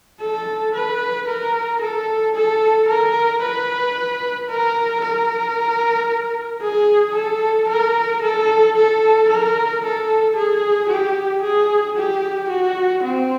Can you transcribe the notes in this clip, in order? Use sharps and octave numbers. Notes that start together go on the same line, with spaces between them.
A4
B4
A#4
A4
A4
A#4
B4
A#4
A#4
G#4
A4
A#4
A4
A4
A#4
A4
G#4
G4
G#4
G4
F#4
C4